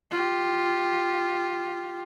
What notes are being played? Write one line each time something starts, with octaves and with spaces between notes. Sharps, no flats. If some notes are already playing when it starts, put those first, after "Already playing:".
F4 G4